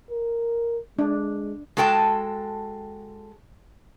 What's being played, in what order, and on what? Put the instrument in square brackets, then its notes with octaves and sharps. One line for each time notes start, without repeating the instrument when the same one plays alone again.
[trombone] A#4
[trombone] G#3 [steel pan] D4
[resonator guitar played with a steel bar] G#3 F#4 A4 G5 A5